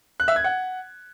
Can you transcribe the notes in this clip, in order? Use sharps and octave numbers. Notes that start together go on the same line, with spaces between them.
F#6
E5
G#6
F#5